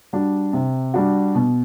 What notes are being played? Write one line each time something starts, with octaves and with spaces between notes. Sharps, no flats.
G3 D4 F#4
C3
G3 D4 F#4
B2